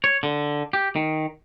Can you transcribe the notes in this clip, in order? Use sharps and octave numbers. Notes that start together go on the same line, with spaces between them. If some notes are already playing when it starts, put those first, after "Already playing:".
C#5
D3
G4
D#3